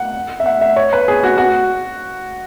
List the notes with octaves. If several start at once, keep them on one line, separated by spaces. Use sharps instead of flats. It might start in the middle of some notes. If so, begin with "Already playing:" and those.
Already playing: F#5
E5
F#5
E5
C#5
B4
G#4
F#4
F#4